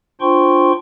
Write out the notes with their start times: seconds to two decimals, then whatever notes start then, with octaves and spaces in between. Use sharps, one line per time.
0.21 D4 F4 C5 G5 C6 C#6